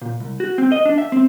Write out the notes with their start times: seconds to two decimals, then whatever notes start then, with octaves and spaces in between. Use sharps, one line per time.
0.02 A#2
0.20 C2
0.40 F#4
0.58 C4
0.72 D#5
0.85 D4
0.98 E5
1.12 C4